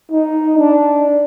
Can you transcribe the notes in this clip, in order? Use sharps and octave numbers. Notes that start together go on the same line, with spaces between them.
D#4
D4